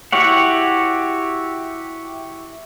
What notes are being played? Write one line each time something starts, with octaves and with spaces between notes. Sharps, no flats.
E4 F#4 G4 C#5 F#5